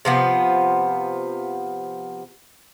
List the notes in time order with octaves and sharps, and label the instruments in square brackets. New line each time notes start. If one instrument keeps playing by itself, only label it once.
[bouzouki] C3 F3 B3